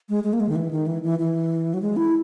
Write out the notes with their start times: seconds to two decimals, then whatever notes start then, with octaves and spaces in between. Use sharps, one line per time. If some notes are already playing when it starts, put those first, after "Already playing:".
0.09 G#3
0.24 G#3
0.33 A#3
0.40 G#3
0.49 D#3
0.56 E3
0.71 D#3
0.87 E3
1.03 E3
1.19 E3
1.74 F#3
1.82 G#3
1.97 E4